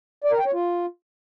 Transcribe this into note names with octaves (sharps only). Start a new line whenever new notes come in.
D5
A#4
G5
C#5
F4